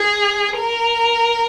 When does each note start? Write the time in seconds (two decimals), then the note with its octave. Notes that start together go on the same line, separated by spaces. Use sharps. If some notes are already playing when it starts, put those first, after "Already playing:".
Already playing: G#4
0.58 A#4